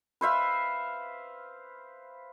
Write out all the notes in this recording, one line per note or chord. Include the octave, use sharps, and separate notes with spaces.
B4 C5 E5 F5